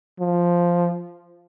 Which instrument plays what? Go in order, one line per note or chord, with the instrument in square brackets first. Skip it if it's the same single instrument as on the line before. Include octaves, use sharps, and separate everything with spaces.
[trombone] F3